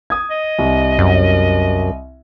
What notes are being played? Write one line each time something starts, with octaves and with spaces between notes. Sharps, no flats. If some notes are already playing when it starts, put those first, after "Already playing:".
D#6 G#6
D#5
C2
F#2